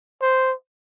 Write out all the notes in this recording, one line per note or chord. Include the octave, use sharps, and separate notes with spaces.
C5